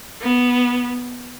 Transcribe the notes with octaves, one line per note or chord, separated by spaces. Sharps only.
B3